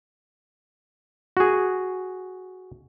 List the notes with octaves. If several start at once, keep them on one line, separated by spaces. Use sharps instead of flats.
F#4 G#4